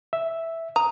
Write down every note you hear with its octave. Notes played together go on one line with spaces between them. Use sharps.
E5
A#5 D#6